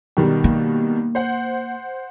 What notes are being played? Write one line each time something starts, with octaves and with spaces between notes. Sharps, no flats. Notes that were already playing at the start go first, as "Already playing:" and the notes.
B2 D#3 G3
A#3
C5 F#5